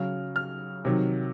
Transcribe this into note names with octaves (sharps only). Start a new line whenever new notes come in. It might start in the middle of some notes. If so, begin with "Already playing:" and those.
Already playing: C#3 F#3 F6
F6
C3 D#3 F#3